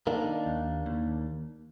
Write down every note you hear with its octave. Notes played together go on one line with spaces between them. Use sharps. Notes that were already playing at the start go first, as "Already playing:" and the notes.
D#3 A#3 D4
D#2
D#2